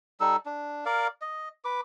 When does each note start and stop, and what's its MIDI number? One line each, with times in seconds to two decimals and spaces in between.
0.21 0.36 55
0.21 0.36 63
0.21 0.36 69
0.21 0.36 88
0.46 0.84 62
0.86 1.07 70
0.86 1.07 74
0.86 1.07 77
1.22 1.49 75
1.65 1.81 71
1.65 1.81 86